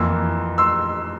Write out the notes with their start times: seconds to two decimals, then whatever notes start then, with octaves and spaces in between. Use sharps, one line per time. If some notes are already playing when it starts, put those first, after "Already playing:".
Already playing: F2 E3 A#3 C6 E6
0.58 C6 E6